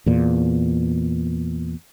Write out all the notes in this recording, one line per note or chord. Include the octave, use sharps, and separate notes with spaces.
E2 A#2